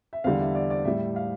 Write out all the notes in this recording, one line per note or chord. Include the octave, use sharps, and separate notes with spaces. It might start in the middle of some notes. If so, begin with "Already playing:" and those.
E5
E2 D3 G3 F5
E5
D5
D5
A2 G3 E5
F5